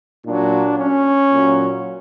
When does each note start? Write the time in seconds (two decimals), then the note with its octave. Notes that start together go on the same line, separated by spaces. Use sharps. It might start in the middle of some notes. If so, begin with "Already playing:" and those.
0.25 A#2 F#3 D4
0.78 C#4
1.31 A#2 F#3